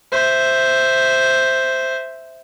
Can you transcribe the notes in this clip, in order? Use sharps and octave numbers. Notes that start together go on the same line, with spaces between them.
C5 E5